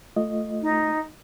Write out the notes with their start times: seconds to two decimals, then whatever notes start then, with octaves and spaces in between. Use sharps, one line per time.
0.16 A3 F4 D#5
0.62 D#4